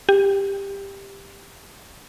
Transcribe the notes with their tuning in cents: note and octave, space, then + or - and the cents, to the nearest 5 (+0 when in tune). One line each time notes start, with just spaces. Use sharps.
G4 +15